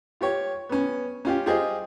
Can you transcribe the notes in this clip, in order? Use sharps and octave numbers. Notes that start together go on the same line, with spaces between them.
F4 G4 C#5
B3 C#4
C#4 F4 G4
F4 G4 G#4 C5 D#5